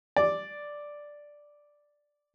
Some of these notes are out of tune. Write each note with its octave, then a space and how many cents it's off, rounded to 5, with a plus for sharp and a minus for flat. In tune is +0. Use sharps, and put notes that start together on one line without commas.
D5 +0